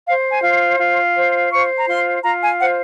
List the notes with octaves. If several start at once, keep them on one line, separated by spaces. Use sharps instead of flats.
C5 F5
G#5
F4
F4
C5
C5 C#6
A#5
F4 C6
F4 A#5
G#5
C5 F#5